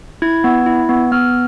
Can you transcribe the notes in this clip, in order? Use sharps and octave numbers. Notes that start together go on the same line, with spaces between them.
E4 G#6
B3
E4
B3
B3 F6